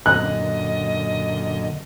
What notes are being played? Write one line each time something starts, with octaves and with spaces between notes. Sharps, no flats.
F#2 A#2 D3 D#5 F#6